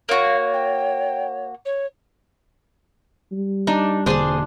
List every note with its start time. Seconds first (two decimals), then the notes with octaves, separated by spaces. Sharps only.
0.09 A#3 F#4 C#5 F5
0.53 G5
1.65 C#5
3.32 G3
3.67 D4 D#4
4.06 E1 D3 A#3 D4 G#4 C5 C6 D6